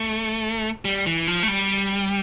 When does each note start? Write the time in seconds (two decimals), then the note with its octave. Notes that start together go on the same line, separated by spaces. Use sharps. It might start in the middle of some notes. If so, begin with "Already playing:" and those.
Already playing: A3
0.85 G3
1.06 E3
1.27 F3
1.43 A3
1.48 G3